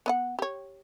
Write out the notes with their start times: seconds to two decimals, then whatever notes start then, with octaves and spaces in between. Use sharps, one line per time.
0.06 B3 D#5 F#5
0.39 G4 C#5